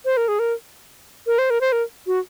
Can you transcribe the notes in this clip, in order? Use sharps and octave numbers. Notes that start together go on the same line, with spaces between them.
C5
A#4
G#4
A#4
A#4
C5
A#4
C5
A#4
F#4